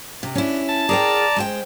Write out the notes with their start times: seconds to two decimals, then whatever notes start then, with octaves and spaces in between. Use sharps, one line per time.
0.23 C3
0.35 C#4 D4 E4
0.69 A5
0.89 G#4 A#4 D5 G5 A#5
1.36 G#3 C5 G5